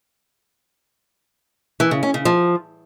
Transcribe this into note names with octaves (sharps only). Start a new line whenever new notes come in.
E3
C#3
C#4
C#3
F3